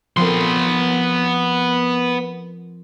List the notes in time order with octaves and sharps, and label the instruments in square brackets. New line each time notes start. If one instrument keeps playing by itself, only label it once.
[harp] F3 C4 A#4 [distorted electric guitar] B3 C6